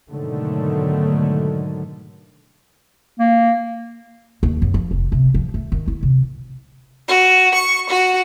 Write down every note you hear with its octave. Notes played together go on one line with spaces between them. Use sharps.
G#2 B2 D3 D#3 F#3 A3
A#3
D#2
F#2
F3
F1
C3
F3
A3
D#3
E4
C3
F#4
C#6
F#4